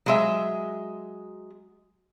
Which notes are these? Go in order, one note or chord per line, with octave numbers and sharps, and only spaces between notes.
F#3 G#3 E5